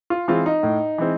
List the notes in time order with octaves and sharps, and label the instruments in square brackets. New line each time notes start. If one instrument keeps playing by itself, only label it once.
[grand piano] F4
E3 G#3 C4 F4
D#4
A2
E3 G#3 C4